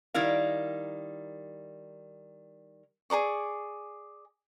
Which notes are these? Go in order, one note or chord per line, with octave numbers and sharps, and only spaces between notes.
D#3 G3 E4 A#4 F5
G#4 A4 D5 C#6